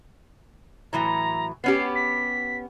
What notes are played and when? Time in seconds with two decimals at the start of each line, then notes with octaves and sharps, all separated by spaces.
0.93 A2 E3 F#3 A#5
1.64 B3 C#4 G4 C7
1.95 B6